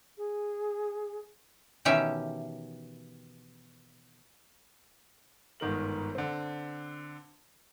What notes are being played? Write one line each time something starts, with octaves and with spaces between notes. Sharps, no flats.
G#4
B2 D#3 E3 C#4 G4 E5
G1 G#2 D#3 A#4 F#7
D3 C4